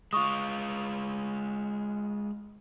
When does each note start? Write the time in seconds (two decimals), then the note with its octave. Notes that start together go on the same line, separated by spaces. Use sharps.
0.13 G#3 F4 C#6 D#6